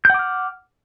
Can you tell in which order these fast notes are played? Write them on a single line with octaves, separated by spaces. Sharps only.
G6 F#5 D6 F6